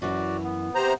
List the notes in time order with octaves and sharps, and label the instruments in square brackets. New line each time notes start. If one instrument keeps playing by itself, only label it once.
[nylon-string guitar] F#2 E3 [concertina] F#4 D5
[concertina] B3
[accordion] C3 C5 A#5